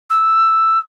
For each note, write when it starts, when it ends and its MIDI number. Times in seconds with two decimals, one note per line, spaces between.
0.10 0.79 88